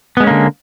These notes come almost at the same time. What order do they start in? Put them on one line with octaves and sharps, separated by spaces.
B3 G#3 C#4 A#3 D3